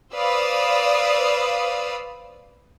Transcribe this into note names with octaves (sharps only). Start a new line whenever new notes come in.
B4 C5 D5 F5 D#6 E6